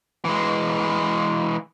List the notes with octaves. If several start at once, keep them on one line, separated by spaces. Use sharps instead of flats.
E3 G#3